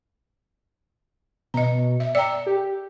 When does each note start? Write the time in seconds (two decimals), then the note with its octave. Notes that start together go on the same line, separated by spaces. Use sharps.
1.54 B2 D#5 A#5
2.00 E5
2.15 D5 G5 A#5 E6
2.46 G4